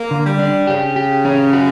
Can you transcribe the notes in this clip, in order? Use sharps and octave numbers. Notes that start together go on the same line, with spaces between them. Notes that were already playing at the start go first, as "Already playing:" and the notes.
Already playing: A#3
D3
G3
D4
C#3 G4
G4
C#4
F#4